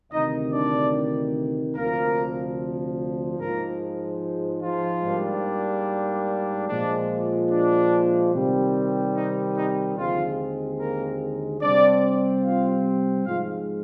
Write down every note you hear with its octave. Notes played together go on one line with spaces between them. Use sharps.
D2 C3 D#3 D#4 D#5
D4 D5
D2 C3 F3 A#3 A#4
G#2 F3 G#3 A#3 A#4
F3 F4
G#2 G3 A#3 D4
A#2 F3 G#3 D4
D4
C3 D#3 G3 C4
D#4
D#4
D#2 D3 F3 G#3 C4 F4
A#3 A#4
C3 G3 C4 D4 D5
F4 F5
G#2 F3 G#3 F4 F5